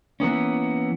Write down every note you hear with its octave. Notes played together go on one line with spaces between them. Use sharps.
E3 A#3 B3 C#4